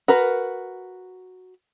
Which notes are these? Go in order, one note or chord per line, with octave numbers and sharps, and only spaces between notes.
F#4 A#4 B4